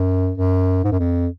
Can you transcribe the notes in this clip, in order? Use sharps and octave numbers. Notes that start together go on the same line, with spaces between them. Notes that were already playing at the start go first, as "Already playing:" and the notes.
Already playing: F#2
F#2
G#2
F#2
F2